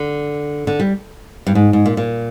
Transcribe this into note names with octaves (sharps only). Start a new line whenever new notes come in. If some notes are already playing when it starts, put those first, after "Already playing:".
Already playing: D3
D3
G3
G2
G#2
G#2
A#2
A#2